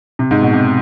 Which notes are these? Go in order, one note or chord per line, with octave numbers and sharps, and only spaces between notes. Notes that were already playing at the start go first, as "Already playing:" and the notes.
C3
G#2
B2
C3